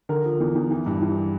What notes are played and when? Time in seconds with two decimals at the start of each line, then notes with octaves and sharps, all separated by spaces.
0.09 D3 A#4
0.25 F3
0.40 E2
0.55 E2
0.70 E3
0.86 G2
1.02 E3